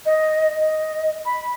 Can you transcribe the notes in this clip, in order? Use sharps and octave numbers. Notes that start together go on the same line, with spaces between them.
D#5
D#5
B5